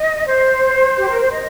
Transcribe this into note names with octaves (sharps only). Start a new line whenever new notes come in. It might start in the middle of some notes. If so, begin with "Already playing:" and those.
Already playing: D#5
C5
G4
A#4
C5
D#5